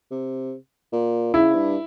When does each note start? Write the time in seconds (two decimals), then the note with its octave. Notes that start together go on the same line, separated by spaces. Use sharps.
0.11 C3
0.93 A#2
1.34 C#3 E4
1.55 G2